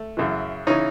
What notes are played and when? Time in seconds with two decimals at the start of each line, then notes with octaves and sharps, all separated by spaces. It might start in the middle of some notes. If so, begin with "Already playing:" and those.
Already playing: A3
0.17 F#2 C#3 E3
0.67 C#3 E3 C#4 D#4